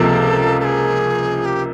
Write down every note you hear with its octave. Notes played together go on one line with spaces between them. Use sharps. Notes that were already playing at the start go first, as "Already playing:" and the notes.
Already playing: C#2 C3 F3 A#3 A4
A4
G#4
G4